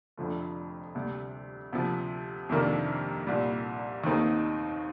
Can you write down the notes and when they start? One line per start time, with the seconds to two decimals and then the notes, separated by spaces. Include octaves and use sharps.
0.17 F1 F2 D3 F3 A3
0.95 D2 C3 G3
1.72 D2 C3 F3
2.49 F2 C3 D#3 A#3 D4
3.27 C2 A#2 G3
4.04 D#2 D#3 A3 C4 D#4